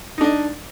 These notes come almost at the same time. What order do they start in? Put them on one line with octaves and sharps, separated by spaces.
D#4 D4 D#5